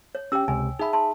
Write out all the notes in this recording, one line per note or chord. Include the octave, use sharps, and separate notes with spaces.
C#5
C#4 G4 G5 E6
C#2 C3 G#5
D#4 G#4 E5 B5
A5 C6